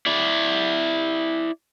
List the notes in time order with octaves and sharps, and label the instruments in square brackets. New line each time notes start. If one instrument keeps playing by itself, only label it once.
[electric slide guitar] E4 D5